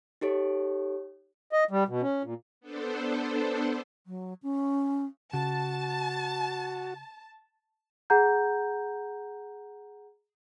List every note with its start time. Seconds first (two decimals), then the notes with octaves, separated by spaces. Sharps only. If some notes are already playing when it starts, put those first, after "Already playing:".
0.21 D#4 G4 A4 C#5
1.53 D#5
1.71 G3
1.88 B2
2.02 C#4
2.23 A#2
2.61 B3 D4 A4 C5
4.07 F#3
4.43 C#4
5.33 C#3 F#4 A5
8.10 G#4 F#5 A#5 G6